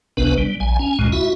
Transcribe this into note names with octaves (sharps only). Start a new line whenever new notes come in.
G#1 C#2 C3 B3 D4 B4
G3
A#1 G#5
C#4 G#5
C#2 F#2 A#2 G#3
E4 F#4 E5